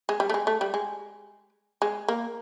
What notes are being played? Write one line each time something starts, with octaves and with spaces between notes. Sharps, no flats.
G#3
G3
A3
G#3
A3
G3
G#3
G#3
A#3